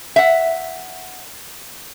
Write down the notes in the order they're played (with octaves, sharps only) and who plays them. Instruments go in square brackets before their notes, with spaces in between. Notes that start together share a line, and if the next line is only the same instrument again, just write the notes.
[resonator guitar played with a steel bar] E5 F#5